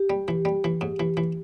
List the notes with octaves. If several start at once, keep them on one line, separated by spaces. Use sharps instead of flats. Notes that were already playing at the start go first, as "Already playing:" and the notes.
Already playing: G4
G3
E3
G3
E3
G#2
E3
E3